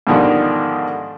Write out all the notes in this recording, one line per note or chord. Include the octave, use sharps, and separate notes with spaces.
G#2 B2 D3 D#3 F3 G3